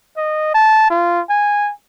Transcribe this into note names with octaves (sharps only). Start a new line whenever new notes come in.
D#5
A5
F4
G#5